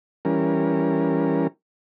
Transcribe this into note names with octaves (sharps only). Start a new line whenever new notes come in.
E3 G3 C#4 A#4